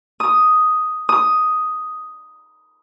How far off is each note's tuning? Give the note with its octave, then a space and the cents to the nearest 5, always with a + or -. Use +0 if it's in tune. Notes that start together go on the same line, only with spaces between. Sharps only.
D#6 +5
D#6 +5